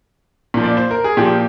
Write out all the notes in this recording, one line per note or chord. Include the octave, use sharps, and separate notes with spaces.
A#2 F3
D5
C5
A#4
G#4
A#2 F3 G4